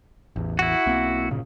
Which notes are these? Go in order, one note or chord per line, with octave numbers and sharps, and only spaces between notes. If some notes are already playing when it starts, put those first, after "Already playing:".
A1 E2
E4 F#4
B1 A#3 C4
G1 A#2 C#3